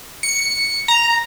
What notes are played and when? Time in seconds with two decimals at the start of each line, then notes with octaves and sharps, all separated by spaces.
0.23 C#7
0.88 A#5